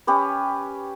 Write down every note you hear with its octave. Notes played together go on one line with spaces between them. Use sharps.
C#4 G4 B4